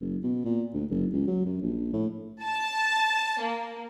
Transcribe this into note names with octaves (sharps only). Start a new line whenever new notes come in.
F#1
B2
A#2
D2
F#1
C#2
F#3
F#2
A#1
A2
A5
A#3